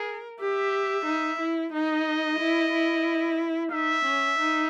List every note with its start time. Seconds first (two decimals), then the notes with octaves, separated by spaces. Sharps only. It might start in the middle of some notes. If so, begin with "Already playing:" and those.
Already playing: G#4 A#4
0.39 G4 E5
1.06 D#4
1.39 E4
1.72 D#4 D#5
2.39 E4
2.73 E4
3.72 D#4 E5
4.05 C#4
4.39 D#4